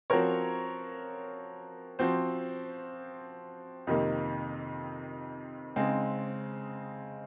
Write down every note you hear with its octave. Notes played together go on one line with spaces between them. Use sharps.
F3 C4 F#4 A#4 C#5
F3 C4 F#4 C5
F2 C3 D#3 A#3 D#4
C#3 G#3 C4 D#4